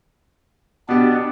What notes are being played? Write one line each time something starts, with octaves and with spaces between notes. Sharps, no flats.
B2 B3 D4 G4